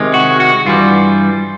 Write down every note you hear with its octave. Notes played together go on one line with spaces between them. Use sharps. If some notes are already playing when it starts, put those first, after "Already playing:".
Already playing: C3 D#3 G#3
F#4
F#4
G2 E3 G3 F4